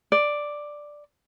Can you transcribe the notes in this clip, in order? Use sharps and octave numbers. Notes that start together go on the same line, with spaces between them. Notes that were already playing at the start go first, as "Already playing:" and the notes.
D5